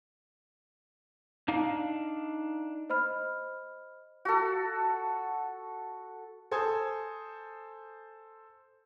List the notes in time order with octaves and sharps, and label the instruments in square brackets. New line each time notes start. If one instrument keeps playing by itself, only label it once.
[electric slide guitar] D4 D#4 F5
[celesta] C5 D#5 B5 F6
[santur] F#4 A4
[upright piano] A4 C5 G#5 D#6 G#6